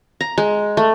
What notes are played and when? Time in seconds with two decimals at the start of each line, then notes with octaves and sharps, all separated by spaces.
0.21 A#5
0.38 G#3
0.77 A3